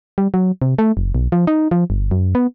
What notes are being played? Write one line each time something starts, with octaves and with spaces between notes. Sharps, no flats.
G3
F#3
C3
A3
F#1
B1
F3
D#4
F3
G1
F#2
B3